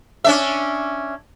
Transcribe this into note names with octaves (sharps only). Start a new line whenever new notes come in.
C#4 D4 E5